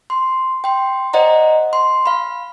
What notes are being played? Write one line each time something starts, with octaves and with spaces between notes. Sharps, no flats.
C6
G5 C6
C5 D5 D#5 F#5 A#5
C6
F5 B5